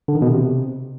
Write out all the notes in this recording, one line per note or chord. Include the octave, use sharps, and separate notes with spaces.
D3
D#3
B2
C3